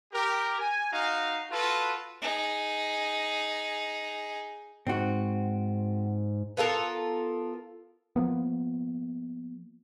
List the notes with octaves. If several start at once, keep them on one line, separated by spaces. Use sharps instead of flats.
G4 A#4
G#5
D#4 F#4 F5
F4 F#4 A4 B4
D#4 G#4
G#2 C4 F#4
B3 F4 A4 A#4
F3 A#3 B3